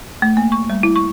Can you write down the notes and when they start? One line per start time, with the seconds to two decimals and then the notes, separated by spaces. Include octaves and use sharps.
0.22 A3
0.37 A#3
0.52 C#6
0.70 G3
0.83 E4
0.96 C#6